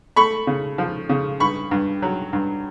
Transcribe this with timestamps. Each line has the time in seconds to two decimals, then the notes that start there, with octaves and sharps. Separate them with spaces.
0.16 A3 B5 C#6
0.47 C#3
0.78 F3
1.09 C#3
1.40 G2 B5 C#6
1.71 G2
2.02 F#3
2.33 G2